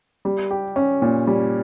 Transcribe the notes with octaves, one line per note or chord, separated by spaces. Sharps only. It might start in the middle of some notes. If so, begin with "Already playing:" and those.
G3
G4
C#4
A#2
G3